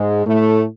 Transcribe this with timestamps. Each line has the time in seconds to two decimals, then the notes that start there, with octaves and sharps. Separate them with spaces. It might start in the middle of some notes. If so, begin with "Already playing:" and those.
Already playing: G#2 G#3
0.26 A2 A3